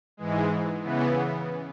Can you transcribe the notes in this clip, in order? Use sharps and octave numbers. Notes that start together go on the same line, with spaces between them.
G#2 E3 G#3
C#3 E3 B3